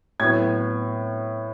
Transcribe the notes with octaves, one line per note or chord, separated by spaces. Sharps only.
A2 F#3 B3 G#6